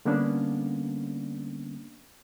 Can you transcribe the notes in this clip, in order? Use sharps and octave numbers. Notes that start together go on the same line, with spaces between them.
D3 G3 A#3 B3 C#4 D4